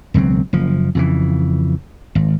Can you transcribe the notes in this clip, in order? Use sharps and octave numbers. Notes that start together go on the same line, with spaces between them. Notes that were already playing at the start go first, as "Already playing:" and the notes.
E1 C#2 F#3 C4
F#1 F3
F2 C#3 E3
G#1